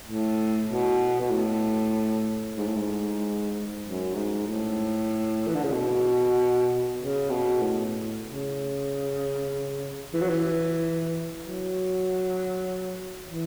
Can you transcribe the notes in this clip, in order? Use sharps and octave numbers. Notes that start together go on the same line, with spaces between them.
A2
B2
B2
A2
G#2
A2
G#2
F#2
G#2
A2
E3
D3
C#3
B2
C#3
B2
A2
C#3
E3
F#3
E3
F#3
E3